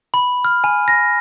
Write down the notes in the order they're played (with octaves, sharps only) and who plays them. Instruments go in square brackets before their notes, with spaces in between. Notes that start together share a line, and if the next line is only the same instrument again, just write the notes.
[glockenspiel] B5
F6
G#5
A#6